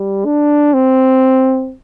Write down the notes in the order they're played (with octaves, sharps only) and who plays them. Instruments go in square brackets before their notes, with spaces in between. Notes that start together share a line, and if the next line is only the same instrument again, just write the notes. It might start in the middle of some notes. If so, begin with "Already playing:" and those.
Already playing: [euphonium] G3
D4
C4